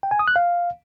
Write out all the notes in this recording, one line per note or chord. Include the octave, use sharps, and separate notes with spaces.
G5
G#5
D#6
F#6
F5